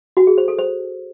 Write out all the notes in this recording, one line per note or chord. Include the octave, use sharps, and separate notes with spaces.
F#4
G#4
C5
A4
C5